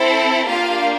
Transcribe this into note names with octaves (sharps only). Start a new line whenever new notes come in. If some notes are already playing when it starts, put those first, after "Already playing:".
Already playing: C4 E4 A4
A#3 D4 F4 G4 F5